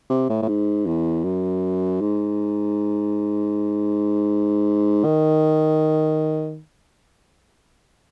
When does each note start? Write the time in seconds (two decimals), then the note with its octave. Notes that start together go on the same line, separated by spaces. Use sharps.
0.10 C3
0.29 A2
0.42 A2
0.48 G#2
0.86 E2
1.24 F#2
2.01 G#2
5.05 D#3